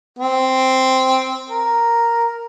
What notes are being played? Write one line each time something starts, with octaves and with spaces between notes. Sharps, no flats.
C4
A#4